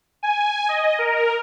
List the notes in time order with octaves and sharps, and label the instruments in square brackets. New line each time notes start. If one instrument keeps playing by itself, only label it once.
[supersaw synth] G#5
D#5
A#4